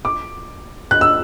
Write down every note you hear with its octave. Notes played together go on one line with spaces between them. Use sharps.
D6
F#6
E6